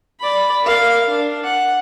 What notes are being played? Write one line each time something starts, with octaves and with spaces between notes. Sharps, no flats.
D5 B5
A#4 F5
D4
F#5